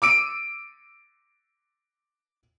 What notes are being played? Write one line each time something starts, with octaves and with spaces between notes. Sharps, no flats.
D6 E6 D7 D#7